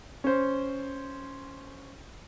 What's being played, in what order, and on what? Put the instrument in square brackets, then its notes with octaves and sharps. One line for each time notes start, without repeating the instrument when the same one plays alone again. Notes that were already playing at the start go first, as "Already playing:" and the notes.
[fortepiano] C#4 C5